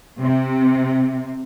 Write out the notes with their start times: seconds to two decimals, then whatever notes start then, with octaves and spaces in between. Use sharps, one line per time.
0.21 C3